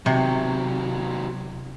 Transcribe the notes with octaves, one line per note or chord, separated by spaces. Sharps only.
C3 D#3 F#3